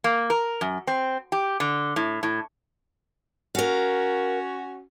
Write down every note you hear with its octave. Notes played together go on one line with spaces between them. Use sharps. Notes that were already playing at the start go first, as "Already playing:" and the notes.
A#3
A#4
F#2
C4
G4
D3
A2
A2
C#4 F#4 A#4 F5